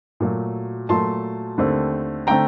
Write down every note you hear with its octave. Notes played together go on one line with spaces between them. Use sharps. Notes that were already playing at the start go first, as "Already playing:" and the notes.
A#2 F#3 A3
A#2 F#3 A3 A5 C6
D#2 D3 A3 C4
D3 A3 C4 G5 A#5